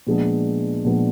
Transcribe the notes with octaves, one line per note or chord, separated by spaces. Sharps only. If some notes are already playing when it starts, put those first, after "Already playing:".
A#2 F3 G#3 B3 D4
A#2 F3 G#3 B3 D4